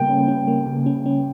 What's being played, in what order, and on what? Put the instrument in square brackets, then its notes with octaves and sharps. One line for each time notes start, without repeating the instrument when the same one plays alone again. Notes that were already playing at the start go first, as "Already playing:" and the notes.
Already playing: [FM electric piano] C#3 G3 A#3 [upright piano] G5
[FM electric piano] C#4
C#4
A#3
C#3
C#4
C#4